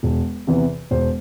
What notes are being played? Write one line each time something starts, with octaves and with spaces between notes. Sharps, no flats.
E1
E2 C3 E3
E1 C5